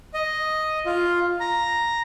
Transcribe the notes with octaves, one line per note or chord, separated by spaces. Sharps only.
D#5
F4
A#5